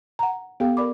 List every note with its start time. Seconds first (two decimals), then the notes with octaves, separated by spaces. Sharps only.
0.19 F#5 A#5
0.60 B3 G4 A4 F5 G5
0.77 A#4 D5 B5 D6